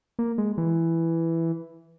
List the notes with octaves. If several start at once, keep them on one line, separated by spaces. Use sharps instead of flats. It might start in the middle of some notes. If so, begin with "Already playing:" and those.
A#3
G#3
E3